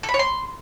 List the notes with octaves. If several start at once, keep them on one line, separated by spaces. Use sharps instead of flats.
A4
B5
C#5
C6